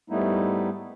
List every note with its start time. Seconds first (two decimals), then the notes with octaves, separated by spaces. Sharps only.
0.10 G#2 G3 A3 B3 D#4 E4